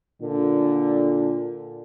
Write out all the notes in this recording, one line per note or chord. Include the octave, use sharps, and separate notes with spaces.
A#2 D3